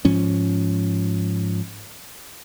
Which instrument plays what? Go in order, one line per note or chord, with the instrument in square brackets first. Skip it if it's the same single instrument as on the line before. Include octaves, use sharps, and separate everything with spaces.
[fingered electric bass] G#2 F3 C#4